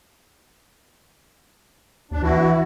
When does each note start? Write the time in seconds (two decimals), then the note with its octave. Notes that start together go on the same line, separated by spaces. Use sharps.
2.11 D#2 D4
2.23 E3 E4 F#4